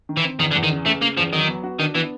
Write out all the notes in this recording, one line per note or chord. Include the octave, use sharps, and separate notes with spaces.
D#3
E3
C4
E2 D#3
D3
E2
D#3
C#3
C#3 A3
C#3 A#3
E2 F3
D#3 F#3
B3
F#4
D#3 D4
E3 B3